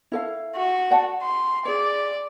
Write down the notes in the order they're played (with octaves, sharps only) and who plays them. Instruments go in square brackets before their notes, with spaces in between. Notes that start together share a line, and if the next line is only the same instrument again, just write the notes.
[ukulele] E4 A4 F5
[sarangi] F#4
[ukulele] D5 F#5 A5
[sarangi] C6
[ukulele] G#4 C#5 [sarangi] D5